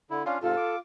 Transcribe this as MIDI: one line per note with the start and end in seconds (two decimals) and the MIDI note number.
0.11 0.23 50
0.11 0.23 64
0.26 0.38 61
0.26 0.38 62
0.26 0.38 65
0.26 0.39 77
0.42 0.55 44
0.42 0.55 48
0.42 0.78 65
0.42 0.75 69
0.57 0.78 86